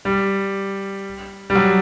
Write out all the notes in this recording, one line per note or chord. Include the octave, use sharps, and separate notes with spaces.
G3
G3
F#3